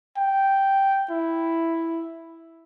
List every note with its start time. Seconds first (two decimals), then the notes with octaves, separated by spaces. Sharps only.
0.18 G5
1.11 E4